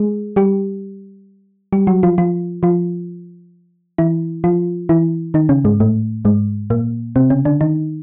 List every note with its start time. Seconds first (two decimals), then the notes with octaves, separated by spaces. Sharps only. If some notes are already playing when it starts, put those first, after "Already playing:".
Already playing: G#3 G#4
0.36 G3 G4
1.73 G3 G4
1.87 F#3 F#4
2.03 F3 F4
2.18 F3 F4
2.63 F3 F4
3.98 E3 E4
4.44 F3 F4
4.89 E3 E4
5.34 D#3 D#4
5.49 C#3 C#4
5.65 G#2 G#3
5.80 A2 A3
6.25 G#2 G#3
6.70 A#2 A#3
7.16 C3 C4
7.30 C#3 C#4
7.45 D3 D4
7.61 D#3 D#4